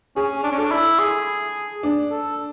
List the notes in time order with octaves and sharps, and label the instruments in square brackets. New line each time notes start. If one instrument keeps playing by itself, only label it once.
[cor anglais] C#4 [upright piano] G#4
[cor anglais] D4
C#4
[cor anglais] D4 [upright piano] A4
[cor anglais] E4
G#4
[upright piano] D4
[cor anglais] A4